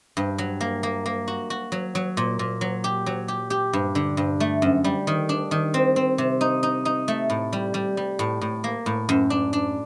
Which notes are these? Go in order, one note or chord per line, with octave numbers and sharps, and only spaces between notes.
G2
F#3
A#3
A#3
A#3
F#4
F#4
F#3
F#3
A#2
A#2
F#3
G4
F#3
G4
G4
G2
D3
G2
A3
F#2
G3
D#3
D4
D#3
C4
C4
C3
D#4
D#4
D#4
A3
A2
G3
G3
G3
A2
A2
A#3
A2
F#2
D4
D4